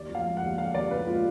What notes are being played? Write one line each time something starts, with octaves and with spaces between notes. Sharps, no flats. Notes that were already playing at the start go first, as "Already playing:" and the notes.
Already playing: D#2 D5
F3
F5
G#3
F#5
D#2
D3 F5
D#2 D5
D3 B4
G#3 F4